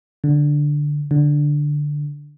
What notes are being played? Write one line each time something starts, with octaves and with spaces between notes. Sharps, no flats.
D3
D3